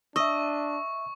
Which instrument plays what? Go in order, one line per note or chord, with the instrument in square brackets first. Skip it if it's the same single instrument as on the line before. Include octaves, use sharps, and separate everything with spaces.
[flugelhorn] D4 [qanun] D#5 [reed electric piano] E5 E6 [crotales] C#6